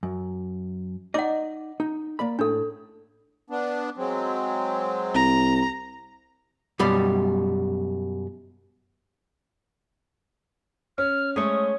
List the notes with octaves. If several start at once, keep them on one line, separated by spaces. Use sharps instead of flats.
F#2
D#4 D5 D#5 F#5 D6
D#4
A#3 D5 B5
A2 D4 A4
B3 D4
F#3 G#3 C4
C2 A#5
F#2 B2 G3 B5
C#4 F6
G#3 A3 C#4 C#5 D#6